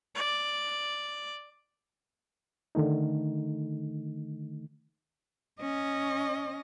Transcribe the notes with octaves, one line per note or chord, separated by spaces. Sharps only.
D5
D3 D#3 A3 D#4
C#4 D#5